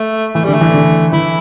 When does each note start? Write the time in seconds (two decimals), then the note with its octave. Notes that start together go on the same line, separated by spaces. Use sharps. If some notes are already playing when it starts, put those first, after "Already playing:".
Already playing: A3
0.35 E3 A3
0.44 D3 G3
0.54 A3
0.61 E3
0.74 D3
1.12 E3 E4